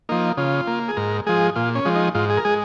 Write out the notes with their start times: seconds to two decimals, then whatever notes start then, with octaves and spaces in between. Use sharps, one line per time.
0.09 F3 A#3 D#4
0.37 C#3 F4
0.67 A#3
0.88 G#4
0.97 G#2 A#4
1.26 F3 G#3 G#4
1.56 A#2 F4
1.75 C#4
1.85 F3 G#3
1.96 D#4
2.15 G#2 F4
2.30 G#4
2.37 A#4
2.45 G#3 G#4